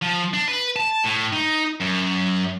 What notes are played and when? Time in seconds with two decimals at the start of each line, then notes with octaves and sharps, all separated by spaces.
0.02 F3
0.33 D4
0.48 B4
0.76 A5
1.04 A2
1.33 D#4
1.81 F#2